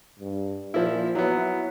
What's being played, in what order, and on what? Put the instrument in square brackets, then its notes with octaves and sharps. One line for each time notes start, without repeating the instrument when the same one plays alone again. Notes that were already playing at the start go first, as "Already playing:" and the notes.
[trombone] G2
[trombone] A#2 [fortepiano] F3 E4
[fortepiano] F#3 B3 [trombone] E4